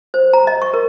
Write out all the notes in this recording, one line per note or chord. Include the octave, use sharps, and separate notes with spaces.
C5
A#5
D#5
C#6
A#4